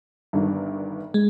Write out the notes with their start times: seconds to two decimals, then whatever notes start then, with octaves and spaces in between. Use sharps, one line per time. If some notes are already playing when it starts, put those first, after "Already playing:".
0.33 G1 G2 D#3
1.14 G#3